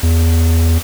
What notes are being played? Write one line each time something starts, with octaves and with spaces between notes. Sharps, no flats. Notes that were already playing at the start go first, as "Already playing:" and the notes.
E2